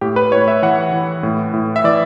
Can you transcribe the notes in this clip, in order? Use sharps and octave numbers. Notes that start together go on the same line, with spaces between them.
A2 G4
B4
A2 C#5
E5
E3 F#5
E3
A2
A2
E5
E3 D5